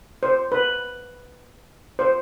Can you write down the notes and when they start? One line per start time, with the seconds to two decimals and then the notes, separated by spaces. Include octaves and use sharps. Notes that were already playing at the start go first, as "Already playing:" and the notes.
0.23 C5
0.52 B4
1.99 C5